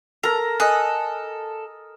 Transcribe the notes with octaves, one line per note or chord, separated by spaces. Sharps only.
A4 A#4 A#5
A4 D#5 G#5 D#6 F#6